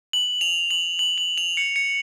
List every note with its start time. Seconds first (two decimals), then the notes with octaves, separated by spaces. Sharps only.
0.13 F#7
0.41 F7
0.71 F#7
0.99 F#7
1.18 F#7
1.38 F7
1.57 C#7
1.76 C#7